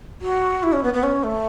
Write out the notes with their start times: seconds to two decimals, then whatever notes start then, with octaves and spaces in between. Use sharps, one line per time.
0.22 F#4
0.63 E4
0.73 C#4
0.83 B3
0.94 B3
1.03 C#4
1.24 A3